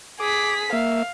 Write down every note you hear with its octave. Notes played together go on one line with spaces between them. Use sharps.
G#4 D6 B6
A#3 E5 F5